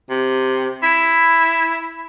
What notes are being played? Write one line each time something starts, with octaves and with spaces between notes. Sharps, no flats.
C3
E4